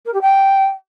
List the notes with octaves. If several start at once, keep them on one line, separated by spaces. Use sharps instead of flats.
A#4
G4
G5